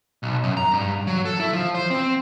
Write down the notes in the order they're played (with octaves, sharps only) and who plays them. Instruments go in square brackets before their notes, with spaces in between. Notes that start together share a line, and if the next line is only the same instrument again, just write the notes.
[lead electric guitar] B1
F#2
A#5
G2
F#3
A4
E4
F3
C5
C4